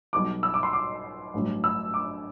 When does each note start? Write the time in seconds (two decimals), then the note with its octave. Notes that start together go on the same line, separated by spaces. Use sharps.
0.13 B1 B2 G3 D6
0.43 E6
0.54 D6
0.63 C6
0.73 D6
1.34 A1 G2 D3 F#3
1.64 E6
1.94 D6